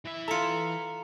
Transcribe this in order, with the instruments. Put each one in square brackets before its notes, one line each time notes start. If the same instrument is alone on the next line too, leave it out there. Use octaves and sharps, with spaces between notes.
[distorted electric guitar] E3 E5
[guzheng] F4 A4 [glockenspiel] A#5 C#7